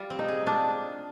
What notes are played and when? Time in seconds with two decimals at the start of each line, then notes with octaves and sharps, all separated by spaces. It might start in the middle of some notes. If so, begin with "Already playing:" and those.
Already playing: G3 F4
0.10 C4
0.19 D#4
0.28 G#4
0.46 D4 F4